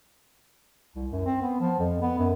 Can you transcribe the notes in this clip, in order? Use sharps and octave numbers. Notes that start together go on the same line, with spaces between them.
C2
F#2
C4
B3
F3
F2
B3
F#2